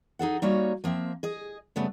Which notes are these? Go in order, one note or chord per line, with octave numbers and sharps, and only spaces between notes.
D#4 G#4 A4 F#5
G3 A#3 D#4 F#4 C#5 E5
F3 A#3 C4 E5
G#4 D#5
C#3 G3 A3 B3